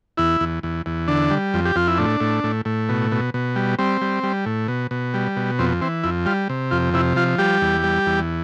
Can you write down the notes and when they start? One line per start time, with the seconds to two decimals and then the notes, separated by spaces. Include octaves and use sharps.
0.17 E2 E4
0.41 E2
0.63 E2
0.86 E2
1.08 D3 D4
1.30 G3
1.54 F2
1.65 G4
1.76 F2 F4
1.88 E4
1.98 A2 D4
2.20 A2
2.44 A2
2.65 A2
2.89 B2
3.12 B2
3.34 B2
3.56 G3
3.79 G3 C4
4.01 G3
4.23 G3
4.46 A2
4.68 B2
4.91 B2
5.14 G3
5.36 B2
5.59 F2 C4
5.81 E3 C4
6.03 F2 E4
6.26 G3 F4
6.49 C3
6.71 F2 F4
6.94 C3 E4
7.16 F3 F4
7.39 G3 G4
7.61 E2
7.84 G3
8.06 E2